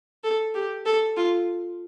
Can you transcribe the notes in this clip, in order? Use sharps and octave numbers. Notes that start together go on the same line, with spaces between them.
A4
G4
A4
F4